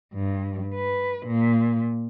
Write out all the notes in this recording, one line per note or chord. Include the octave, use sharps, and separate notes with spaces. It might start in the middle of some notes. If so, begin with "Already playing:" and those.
G2
B4
A#2